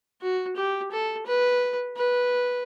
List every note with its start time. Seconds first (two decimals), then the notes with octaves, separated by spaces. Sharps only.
0.22 F#4
0.56 G4
0.91 A4
1.26 B4
1.97 B4